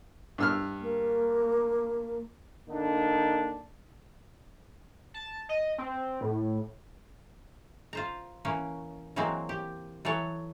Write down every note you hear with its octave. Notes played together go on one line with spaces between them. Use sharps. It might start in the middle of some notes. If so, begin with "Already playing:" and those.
G2 E6 F6
A#3
D3 A#3 D4 D#4
A5
D#5
C4
A2
F4 C5 A#5
E3 A#3 C#4
E3 F#3 G#3 A#3 C4
G4
E3 F#3 A4 C#5